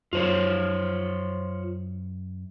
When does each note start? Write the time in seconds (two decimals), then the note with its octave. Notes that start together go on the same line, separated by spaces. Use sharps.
0.13 F#2 F4 C5 C#5